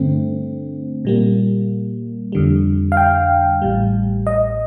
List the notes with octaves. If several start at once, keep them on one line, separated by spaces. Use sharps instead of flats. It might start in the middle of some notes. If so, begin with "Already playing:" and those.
Already playing: G2 D3 A3 C4
A#2 G3 A#3
F2 D3 G3
F5
G5
A1 A2 G3
D#5